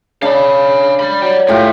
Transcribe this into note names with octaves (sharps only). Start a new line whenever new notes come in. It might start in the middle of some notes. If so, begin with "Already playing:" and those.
C#3 D4 F5 B5
D5 B5
F#3 D5 G5
A2 F4 G4 E5 G5